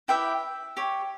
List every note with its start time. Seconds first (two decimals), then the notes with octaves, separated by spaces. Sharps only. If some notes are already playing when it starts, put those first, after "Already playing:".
0.08 E4 G4 B4 E5 G5
0.77 G4 C#5